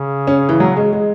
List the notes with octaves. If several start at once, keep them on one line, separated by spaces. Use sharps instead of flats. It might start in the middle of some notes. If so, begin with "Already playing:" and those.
Already playing: C#3
C#4
E3
F#3
G#3
G#3